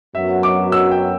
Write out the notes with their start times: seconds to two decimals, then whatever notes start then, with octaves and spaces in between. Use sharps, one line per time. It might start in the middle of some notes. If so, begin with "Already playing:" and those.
0.15 F#2 F#3 B3 F#4 E5
0.43 D6
0.72 E6
0.91 G5